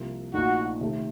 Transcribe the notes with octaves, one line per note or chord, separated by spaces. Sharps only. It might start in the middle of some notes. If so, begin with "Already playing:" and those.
Already playing: C2 C3 F3 A#3
A#1 A#2 A3 D#4 F#4
C3 D#3 A3